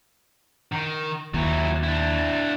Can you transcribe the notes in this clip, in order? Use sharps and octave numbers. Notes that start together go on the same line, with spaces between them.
D#3
D#2 F#3 E4
D4 E4